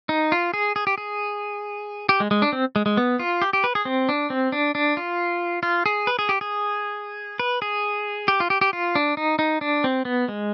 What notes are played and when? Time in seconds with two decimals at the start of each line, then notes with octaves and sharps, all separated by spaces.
0.09 D#4
0.32 F4
0.54 G#4
0.76 G#4
0.87 G4
0.98 G#4
2.09 G4
2.20 G#3
2.31 G#3
2.42 D4
2.53 C4
2.76 G#3
2.86 G#3
2.97 B3
3.19 F4
3.42 G4
3.53 G4
3.64 B4
3.75 G#4
3.85 C4
4.09 D4
4.30 C4
4.52 D4
4.75 D4
4.97 F4
5.63 F4
5.86 G#4
6.07 B4
6.19 G#4
6.29 G4
6.41 G#4
7.40 B4
7.62 G#4
8.28 G4
8.40 F4
8.50 G4
8.61 G4
8.73 F4
8.95 D4
9.17 D#4
9.39 D#4
9.61 D4
9.84 C4
10.05 B3
10.28 G#3